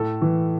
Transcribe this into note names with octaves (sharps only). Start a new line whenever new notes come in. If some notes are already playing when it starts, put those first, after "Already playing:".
Already playing: A2 A4
E3